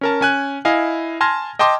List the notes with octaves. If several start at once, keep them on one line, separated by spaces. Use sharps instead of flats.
C#4 A#4 A5
C#4 G#5 F#6
E4 D#5 F5 G#5
G#5 A5 C6 F6 G#6 A#6
D#5 G5 A5 C6 D6